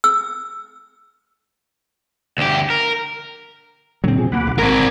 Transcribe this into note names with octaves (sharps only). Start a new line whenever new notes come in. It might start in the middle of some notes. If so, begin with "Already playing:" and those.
E6
D2 G4
A#4
A#2 D3 F#3 C4
B2 F3 G#4
D2 A#3 F#5 B5 D6
B1
G#1 C4 A#4 G#5 B5 D6